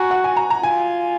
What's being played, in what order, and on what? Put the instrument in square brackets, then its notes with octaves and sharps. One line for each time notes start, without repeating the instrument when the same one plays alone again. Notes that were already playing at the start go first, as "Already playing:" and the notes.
Already playing: [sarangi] F#4 [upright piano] G#5 A#5
[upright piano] F#5
G#5
A#5
A#5
[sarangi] F4 [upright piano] G#5